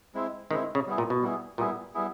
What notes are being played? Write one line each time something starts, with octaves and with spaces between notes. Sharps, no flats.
G#3 C4 E4
D#3 G#3 C4 E4
C#3
G3 B3 E4 G#4
A#2
B2
G3 B3 E4 G#4
A#2 G3 B3 E4 G#4
G3 B3 E4 G#4